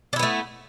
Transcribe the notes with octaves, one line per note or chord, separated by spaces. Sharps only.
A3 B3 D4 E4